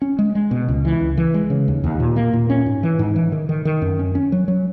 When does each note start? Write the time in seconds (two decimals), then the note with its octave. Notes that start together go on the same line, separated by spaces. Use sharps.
0.02 C#4
0.19 G#3
0.35 G#3
0.51 B2
0.68 C#2
0.85 E3
1.01 C#2
1.17 E3
1.34 G#3
1.50 C#3
1.68 D#2
1.84 D#2
2.00 A#2
2.16 A#3
2.33 A#2
2.50 C#4
2.66 G#2
2.83 E3
2.99 G#2
3.16 E3
3.32 D#3
3.49 D#3
3.65 D#3
3.82 F#2
3.99 C#4
4.15 C#4
4.32 F#3
4.48 F#3